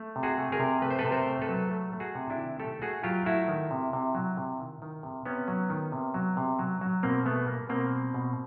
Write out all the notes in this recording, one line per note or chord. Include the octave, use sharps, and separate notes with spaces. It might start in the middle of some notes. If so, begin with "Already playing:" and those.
Already playing: A3
C3
F#4 G#4
A3
G#4 A#4
C3
A3 B4
C5
A4 B4
C3
A#4 C5
A3
A4 B4
F#3
A3
A3
F#4 G#4
C3
D4 E4
D#3
A3 G4 A4
A3 F#4 G#4
F#3 F4 G4
A3 E4 F#4
D#3
C3
C3
F#3
C3
D#3
D#3
C3
C3 B3 C#4
F#3
D#3
C3
F#3
C3
F#3
F#3
B2 A#3 C4
G3 A3 B3
G3 A#3
B2 A#3 C4
G3
B2